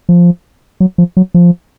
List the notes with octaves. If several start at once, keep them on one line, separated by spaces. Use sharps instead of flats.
F3
F#3
F3
F#3
F3